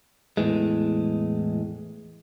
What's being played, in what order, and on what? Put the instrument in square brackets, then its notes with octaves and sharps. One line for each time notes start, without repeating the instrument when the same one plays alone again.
[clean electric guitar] E2 A2 E3 G#3